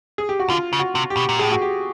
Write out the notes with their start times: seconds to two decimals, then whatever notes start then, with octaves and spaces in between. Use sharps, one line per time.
0.18 G#4
0.29 G4
0.39 F#4
0.50 D3 F4
0.73 C#3
0.79 F#4
0.95 C3
1.10 G4
1.17 B2
1.29 A#2
1.39 A2 G#4
1.52 F#4
1.62 G4